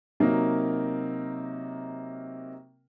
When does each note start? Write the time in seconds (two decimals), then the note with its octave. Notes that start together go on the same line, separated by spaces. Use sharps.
0.20 C3 F#3 A#3 D#4 A#4